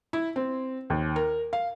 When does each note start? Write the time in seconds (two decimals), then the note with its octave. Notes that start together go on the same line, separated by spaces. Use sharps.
0.13 E4
0.36 C4
0.90 D#2
1.16 A#4
1.53 F5